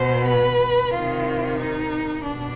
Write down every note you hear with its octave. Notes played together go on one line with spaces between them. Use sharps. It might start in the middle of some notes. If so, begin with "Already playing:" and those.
Already playing: B2 C5
B4
C3 D#3 F4
D#4
B2 D4